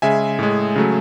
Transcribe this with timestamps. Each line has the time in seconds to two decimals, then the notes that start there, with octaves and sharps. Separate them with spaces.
0.02 C#3 G#3 E5 G#5
0.39 A2 G#3
0.76 C#3 F#3 A3